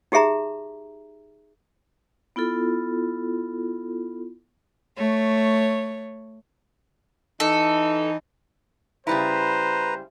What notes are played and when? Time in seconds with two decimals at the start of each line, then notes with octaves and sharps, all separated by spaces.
0.12 D#4 G4 G#4 E5 A#5
2.36 B3 E4 F4 A4
4.97 A3 C#5
7.40 E3 D#4 A4
9.07 C#3 G3 E4 B4 C5 A#5